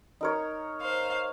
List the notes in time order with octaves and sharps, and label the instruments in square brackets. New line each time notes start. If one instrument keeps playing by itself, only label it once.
[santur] D#4 A#4 C#5
[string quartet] C5 F5